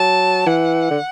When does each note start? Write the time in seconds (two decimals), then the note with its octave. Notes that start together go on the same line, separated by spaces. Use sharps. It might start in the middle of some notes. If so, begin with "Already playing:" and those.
Already playing: F#3 A5
0.46 E3 F#5
0.90 D3